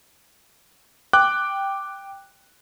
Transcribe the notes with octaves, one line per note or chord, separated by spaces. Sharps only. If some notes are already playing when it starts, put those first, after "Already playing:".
G5 D6 F#6